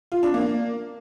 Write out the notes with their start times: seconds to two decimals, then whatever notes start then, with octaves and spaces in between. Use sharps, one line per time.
0.12 F4
0.23 D4
0.34 A#3